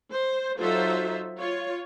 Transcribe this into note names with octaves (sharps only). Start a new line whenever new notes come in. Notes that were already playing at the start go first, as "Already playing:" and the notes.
C5
F#3 D#4 F4 A4 C5 E5
F4 C#5